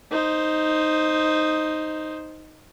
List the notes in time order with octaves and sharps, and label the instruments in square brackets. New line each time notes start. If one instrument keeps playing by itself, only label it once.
[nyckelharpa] D#4 C5